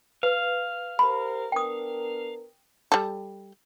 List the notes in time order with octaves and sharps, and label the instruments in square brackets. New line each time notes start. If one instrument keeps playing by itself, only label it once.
[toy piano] B4 [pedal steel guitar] F5
[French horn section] G4 A#4 C5 [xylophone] B5
[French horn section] B3 D4 A#4 [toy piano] G5 D#6
[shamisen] G3 A4